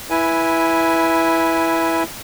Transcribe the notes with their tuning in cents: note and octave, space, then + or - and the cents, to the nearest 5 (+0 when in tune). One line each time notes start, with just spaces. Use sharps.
E4 +0 B4 -15 G#5 +0